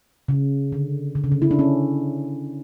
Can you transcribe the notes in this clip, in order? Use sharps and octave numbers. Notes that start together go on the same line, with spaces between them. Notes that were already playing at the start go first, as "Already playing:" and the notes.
C#3
D3
D3
C#3
D3
E4
D4
C#4